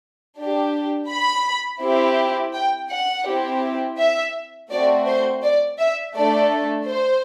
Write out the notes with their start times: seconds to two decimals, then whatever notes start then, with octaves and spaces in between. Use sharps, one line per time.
0.37 D4 G4
1.09 B5
1.82 C4 E4 G4
2.54 G5
2.90 F#5
3.26 C4 E4 G4
3.98 E5
4.71 A3 C4 F#4 D5
5.07 C5
5.43 D5
5.79 E5
6.15 A3 D4 A4 D5
6.88 C5